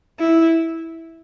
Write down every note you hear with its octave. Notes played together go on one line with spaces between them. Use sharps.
E4